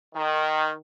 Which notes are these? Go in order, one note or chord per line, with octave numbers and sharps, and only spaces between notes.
D#3